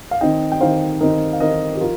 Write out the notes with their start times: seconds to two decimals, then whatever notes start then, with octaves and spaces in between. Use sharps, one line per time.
0.11 F5
0.21 D#3 C4 D#4 D#5 G5
0.52 G5
0.60 D#3 C4 D#4 C5 F5
1.01 D#3 C4 D#4 A#4 D#5
1.33 F5
1.40 D#3 C4 D#4 A#4 D#5
1.75 G4
1.81 F3 F4 A#4